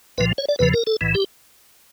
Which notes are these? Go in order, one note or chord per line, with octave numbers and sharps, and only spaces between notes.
C2 A#2 F3 B4
C#5
D5
E2 C#3 F3 B4
A#4
A4
B1 A2 E3
G4